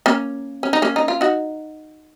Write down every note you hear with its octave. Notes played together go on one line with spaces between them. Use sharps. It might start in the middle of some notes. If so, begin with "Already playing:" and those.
A#3 C#4
C#4
D#4
A#3 C#4
D#4
F4
D#4 F#4